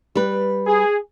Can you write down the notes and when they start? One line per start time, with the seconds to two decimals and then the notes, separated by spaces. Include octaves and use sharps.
0.15 G3 B4
0.66 G#4